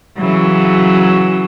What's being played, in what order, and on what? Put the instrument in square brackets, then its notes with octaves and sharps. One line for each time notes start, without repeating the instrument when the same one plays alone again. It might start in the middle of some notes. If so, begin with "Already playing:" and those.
[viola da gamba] C#3 E3 F#3